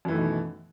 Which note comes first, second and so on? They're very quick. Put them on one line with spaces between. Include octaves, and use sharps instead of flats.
F#2 E3 A3 D#3 B2